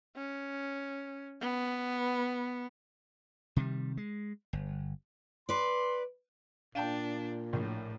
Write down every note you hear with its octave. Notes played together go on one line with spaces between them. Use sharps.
C#4
B3
C3 D#3 G3
G#3
G1
B4 D5 C6
A#2 D4 F5 G5 A5
A#1 A2